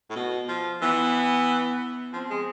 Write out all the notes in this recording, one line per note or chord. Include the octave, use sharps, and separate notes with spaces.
A2
B2
F3
E3 B3
F3 C4
G#3